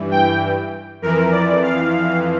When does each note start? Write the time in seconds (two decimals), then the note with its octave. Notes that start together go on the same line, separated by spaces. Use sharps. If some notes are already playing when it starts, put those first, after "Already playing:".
Already playing: G2 E3
0.11 G5
1.02 F2 E3 A#4
1.32 D5
1.63 F5